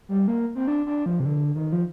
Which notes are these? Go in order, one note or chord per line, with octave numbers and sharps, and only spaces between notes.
G3
A#3
C4
D4
D4
F3
C3
D3
D#3
F3